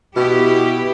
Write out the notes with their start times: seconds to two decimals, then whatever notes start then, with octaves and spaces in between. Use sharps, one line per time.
0.16 B2 B3 E4 G4